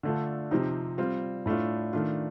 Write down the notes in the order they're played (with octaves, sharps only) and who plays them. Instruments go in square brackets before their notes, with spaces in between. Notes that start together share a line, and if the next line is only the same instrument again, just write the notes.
[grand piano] D3 A3 D4 F4
C3 F3 C4 D#4 G4
G3 C4 F4
A2 A3 D4 F4
D#3 A3 D4 F4